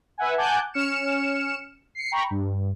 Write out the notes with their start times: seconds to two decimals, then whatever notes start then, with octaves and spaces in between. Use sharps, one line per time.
0.18 B4 E5 F#5 G#5
0.38 F#5 G#5 A5 D6 F#6 G6
0.73 C#4 F6 C#7 E7
1.95 C7 C#7
2.12 G5 A#5 B5 C#6
2.30 G2